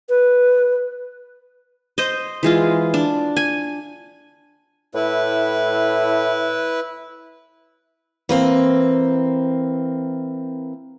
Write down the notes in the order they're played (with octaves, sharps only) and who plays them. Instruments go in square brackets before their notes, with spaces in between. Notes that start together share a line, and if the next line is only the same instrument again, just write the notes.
[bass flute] B4
[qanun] C5 D#5
E3 G#3 F4
D4
G#5
[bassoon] A2 [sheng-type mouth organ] E4 B4
[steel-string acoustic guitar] E3 A#3 C4